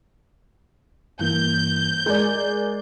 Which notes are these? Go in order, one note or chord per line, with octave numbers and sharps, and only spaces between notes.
G2 E3 A#3 G6
G#3 A#4 D5 G#5